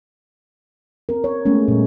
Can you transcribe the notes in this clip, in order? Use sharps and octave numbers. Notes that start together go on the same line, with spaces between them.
C4 A#4
C#5
G#3 A3 B3 C#4
A#2 G3